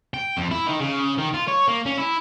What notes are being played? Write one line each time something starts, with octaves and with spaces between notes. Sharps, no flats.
G5
F2
E4
D#3
C#3
D#3
F4
C#5
A#3
C#4
E4